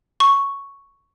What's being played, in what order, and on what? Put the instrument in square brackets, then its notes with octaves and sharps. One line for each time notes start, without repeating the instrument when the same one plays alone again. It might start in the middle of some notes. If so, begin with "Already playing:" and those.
[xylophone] C#6